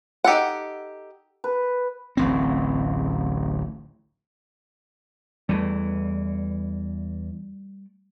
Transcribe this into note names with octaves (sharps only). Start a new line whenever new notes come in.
D#4 G4 A4 F#5
B4
D1 A1 C4
E2 E3 G3 A3